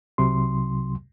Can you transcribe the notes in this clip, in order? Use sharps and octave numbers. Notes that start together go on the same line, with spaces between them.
C2 C3 F#3 C6